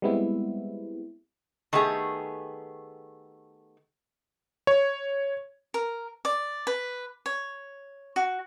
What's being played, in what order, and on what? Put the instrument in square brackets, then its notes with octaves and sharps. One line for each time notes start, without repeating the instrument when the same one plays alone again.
[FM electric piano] G3 G#3 B3 C4 E4
[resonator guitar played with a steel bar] D#3 A3 B3 G4 G#4
[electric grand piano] C#5
[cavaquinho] A#4
D5
B4
C#5
F#4